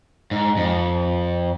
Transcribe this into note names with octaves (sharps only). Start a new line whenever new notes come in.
G#2
F2